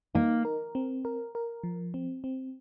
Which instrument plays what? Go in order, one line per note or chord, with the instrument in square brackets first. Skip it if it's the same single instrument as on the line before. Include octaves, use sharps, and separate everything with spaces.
[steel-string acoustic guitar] A#3 [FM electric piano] D#4
[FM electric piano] A#4
C4
A#4
A#4
F3
C4
C4